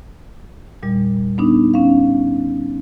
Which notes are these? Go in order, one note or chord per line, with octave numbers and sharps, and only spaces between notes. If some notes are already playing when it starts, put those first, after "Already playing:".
E2 A#2 G3
B3 D4 D#4
C#4 F5